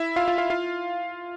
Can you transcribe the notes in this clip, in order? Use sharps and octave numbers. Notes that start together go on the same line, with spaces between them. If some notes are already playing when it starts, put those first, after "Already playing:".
Already playing: E4 E5
F4 F5
F4 F5
F4 F5
F4 F5